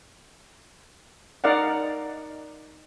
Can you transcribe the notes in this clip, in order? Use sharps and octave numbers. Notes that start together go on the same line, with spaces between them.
D#4 A#4 D5 F5 F#5